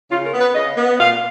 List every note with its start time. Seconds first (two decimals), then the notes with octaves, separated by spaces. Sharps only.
0.11 C#3 F4
0.25 A#4
0.34 B3
0.41 B4
0.55 C#3 D#5
0.77 B3
0.99 A#2 F5